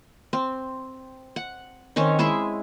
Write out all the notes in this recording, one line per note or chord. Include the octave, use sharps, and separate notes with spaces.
C4
F#5
D#3 C4 C#4 C#5
G#3 E4 G#4 E5